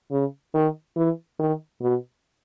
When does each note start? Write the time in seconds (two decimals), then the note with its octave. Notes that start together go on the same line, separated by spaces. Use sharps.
0.11 C#3
0.54 D#3
0.96 E3
1.39 D#3
1.82 B2